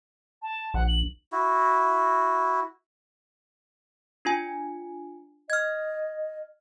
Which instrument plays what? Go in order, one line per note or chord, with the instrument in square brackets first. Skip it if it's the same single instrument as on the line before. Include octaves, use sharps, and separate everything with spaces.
[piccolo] A5
[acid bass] A#1 [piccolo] F#5
[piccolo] F#7
[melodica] E4 F#4
[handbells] D4 F4 G#5
[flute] D#5 [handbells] F6 G#6